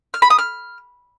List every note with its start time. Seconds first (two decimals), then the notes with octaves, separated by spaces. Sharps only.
0.14 F6
0.22 B5
0.30 D#6
0.38 F6